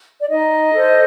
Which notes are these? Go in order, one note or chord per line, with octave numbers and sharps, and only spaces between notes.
D5
D#4 D#5
A4 C5